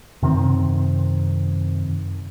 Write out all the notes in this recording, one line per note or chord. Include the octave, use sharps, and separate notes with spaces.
F#2 C3 D#3 C4